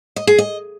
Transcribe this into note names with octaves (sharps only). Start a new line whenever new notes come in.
D#5
G#4
D#5